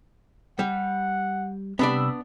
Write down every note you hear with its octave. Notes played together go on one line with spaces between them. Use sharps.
G3 F#5
C3 G3 B3 D4 D5 B5 E6